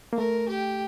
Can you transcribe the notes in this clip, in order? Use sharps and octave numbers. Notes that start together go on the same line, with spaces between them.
A#3
A3 A#4
G4